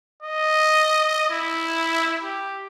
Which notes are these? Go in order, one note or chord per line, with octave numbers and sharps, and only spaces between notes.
D#5
E4
G4